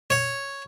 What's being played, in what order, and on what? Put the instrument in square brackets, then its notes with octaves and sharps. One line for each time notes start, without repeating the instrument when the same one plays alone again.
[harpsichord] C#5